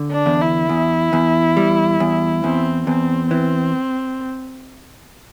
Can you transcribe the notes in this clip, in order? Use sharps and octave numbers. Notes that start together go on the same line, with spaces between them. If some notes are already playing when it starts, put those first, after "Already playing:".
Already playing: D3
D4
E2
E4
E2
E2
G3
E2
E2 C4
E2 C4
E3 C4